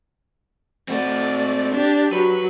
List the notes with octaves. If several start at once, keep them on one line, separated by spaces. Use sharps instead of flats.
A3 C4 F#4 D5
D4 G4
F#3 B4